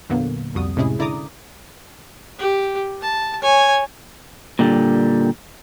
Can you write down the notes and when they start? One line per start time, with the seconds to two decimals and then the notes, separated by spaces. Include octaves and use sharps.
0.09 E2 A#2 D3 F#3 A#3 B3
0.55 C2 F2 G3 F#4 D#6
0.76 A2 C3 G#3 C#4 E4 G#4
0.99 D3 E4 D5 A#5 D6 D#6
2.39 G4
3.02 A5
3.42 C#5 G#5
4.59 A#2 D3 G3